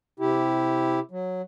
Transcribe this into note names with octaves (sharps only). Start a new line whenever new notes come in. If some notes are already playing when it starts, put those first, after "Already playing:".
C3 E4 G4
F#3